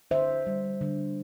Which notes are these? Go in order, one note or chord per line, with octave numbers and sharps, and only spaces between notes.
D3 C5 E5
G3
D3